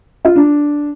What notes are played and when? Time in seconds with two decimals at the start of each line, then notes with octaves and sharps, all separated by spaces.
0.25 F4
0.36 D4